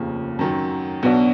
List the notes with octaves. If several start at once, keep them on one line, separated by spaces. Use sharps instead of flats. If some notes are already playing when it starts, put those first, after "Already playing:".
Already playing: F1 D#2 C#3 F3
F#2 D#3 F#3
B1 B2 F#3 B3 D4